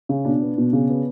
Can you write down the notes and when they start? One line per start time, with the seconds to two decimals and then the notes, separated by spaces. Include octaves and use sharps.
0.09 C#3
0.25 B2 D4
0.42 B3
0.58 B2
0.73 C#3
0.89 B3